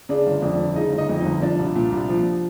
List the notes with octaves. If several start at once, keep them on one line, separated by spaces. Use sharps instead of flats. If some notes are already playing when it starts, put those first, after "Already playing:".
C#3 D4 D5
G1
F2 D4 D5
G1
C#3 D#4 D#5
G1
D#4 D#5
F2
D#4 D#5
G1
F3 D4 D5
C2
A#2
C2
F3